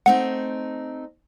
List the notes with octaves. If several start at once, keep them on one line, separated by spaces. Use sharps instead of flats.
A3 C4 D#4 F#5